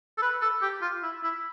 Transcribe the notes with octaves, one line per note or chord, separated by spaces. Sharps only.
A4
B4
A4
G4
F4
E4
E4